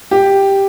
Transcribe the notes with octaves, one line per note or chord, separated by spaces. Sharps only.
G4